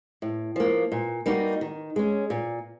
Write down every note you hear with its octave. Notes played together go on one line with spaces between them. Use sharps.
A2
F3 A#3
A#2
G3 A#3 D#4 F#4
D#3
G#3 C#4
A#2